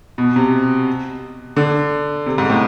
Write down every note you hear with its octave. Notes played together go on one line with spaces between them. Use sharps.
B2
C3
D3
C3
G#2
A2